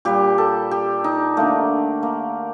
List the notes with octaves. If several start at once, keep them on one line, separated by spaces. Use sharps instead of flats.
A#2 G3 G4
A4
G4
D#4
D3 A3 A#3
A#3